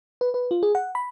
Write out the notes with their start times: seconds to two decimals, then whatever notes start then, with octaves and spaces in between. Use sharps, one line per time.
0.21 B4
0.34 B4
0.51 F4
0.63 G#4
0.75 F#5
0.95 B5